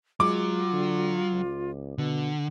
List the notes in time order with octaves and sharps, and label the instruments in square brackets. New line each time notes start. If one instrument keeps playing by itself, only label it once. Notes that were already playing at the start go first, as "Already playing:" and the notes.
[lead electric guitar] F#3 [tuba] G#3 [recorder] F4 [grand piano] D6
[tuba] D3
C#2
[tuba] B2 [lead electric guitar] D3